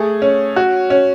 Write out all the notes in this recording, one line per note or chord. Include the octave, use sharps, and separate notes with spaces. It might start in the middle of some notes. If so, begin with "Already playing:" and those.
Already playing: A3 G#4
C#4
F#4
C#4